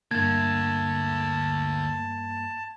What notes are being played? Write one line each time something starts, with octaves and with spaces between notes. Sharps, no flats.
D2 G2 D3 A#3 A5 G#6